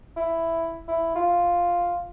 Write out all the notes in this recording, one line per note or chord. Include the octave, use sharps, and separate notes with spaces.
E4
E4
F4